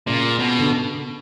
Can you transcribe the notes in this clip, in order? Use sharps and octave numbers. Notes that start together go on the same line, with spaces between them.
A#2 C#3
B2
D3